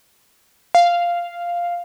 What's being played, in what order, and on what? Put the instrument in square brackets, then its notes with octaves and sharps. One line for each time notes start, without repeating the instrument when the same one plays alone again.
[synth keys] F5